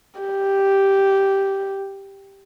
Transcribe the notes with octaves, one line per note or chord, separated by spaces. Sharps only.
G4